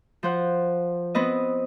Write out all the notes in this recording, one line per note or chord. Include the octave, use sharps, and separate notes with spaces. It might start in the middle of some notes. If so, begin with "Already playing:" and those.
F3 C5 F#5
B3 C4 B4 D#5